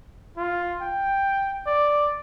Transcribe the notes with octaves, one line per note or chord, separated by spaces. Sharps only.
F4
G5
D5